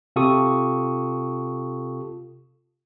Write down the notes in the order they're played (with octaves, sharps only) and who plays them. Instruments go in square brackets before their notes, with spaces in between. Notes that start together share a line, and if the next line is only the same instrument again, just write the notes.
[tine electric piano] C3 F4 G4 A4 C#6 D#6